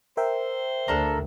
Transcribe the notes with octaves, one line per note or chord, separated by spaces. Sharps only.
A#4 C5 E5 G5
D2 A#3 D4 A4